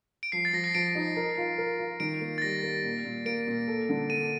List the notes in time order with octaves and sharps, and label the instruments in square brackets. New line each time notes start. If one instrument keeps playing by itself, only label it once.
[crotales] D7
[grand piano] F3 [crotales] C7
[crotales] A6
[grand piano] F3 [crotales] A#6
[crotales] C7
[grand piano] F3 [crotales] D7
[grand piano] D#4
A#4
F4
A#4
F4
[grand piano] D#3 [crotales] D7
[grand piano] A#3
[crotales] A6
[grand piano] G3 [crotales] A#6
[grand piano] A#3
A#2
A#2
[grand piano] A#3 [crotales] D7
[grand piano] A#2
A4
D3
[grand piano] A4 [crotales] D#7